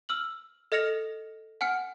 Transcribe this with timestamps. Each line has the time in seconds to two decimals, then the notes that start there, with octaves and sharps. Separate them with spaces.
0.09 E6 F6 F#7
0.72 A4 D#5 F6 A#6 C#7 F7
1.61 F#5 G#5 F6 C#7